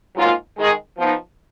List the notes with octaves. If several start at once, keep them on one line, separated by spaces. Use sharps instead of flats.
G#2 F#3 A#3 F4
D#3 G#3 D#4 G#4
F3 B3 D#4